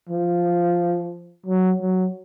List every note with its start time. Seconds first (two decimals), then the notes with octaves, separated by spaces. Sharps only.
0.09 F3
1.46 F#3
1.81 F#3